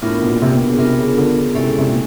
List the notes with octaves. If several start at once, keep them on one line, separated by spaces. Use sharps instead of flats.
A2 B3 D4 F4 A#4
B2
A#2
C3
B2
C#3
C3 B3 D4 F4 A#4
C#3
D3
C#3
C3 G#3 C#4 E4 A4 D5
C#3
C3
A#2